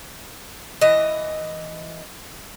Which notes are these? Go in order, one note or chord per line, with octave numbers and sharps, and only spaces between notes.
E3 D#5